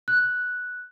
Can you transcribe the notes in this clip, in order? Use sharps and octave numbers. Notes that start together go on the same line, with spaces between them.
F#6